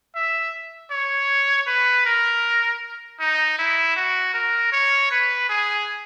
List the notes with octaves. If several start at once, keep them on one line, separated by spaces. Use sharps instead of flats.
E5
C#5
B4
A#4
D#4
E4
F#4
A#4
C#5
B4
G#4